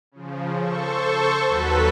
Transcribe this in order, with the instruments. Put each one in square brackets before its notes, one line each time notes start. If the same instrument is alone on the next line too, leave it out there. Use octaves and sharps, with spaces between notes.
[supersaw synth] C#3 F3
A4 C5 C#6
D#2 F#3 F#4 A4 B4 B6